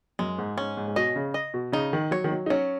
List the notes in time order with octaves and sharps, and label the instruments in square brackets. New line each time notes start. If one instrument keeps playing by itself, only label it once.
[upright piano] F#2 [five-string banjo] G#3
[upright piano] G#2
[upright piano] G#2 [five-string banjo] C#4
[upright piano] G#2
G#2
[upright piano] B2 [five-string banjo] D#5
[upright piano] C#3
[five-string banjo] D#5
[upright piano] B2
[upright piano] C#3 [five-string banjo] D#4
[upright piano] D#3
[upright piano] F#3 [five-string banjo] C#5
[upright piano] D#3
F#3
D#4
[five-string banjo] F#3 [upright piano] C#4